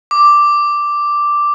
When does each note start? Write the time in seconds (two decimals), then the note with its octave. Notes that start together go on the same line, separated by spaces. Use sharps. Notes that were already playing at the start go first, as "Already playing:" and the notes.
0.11 D6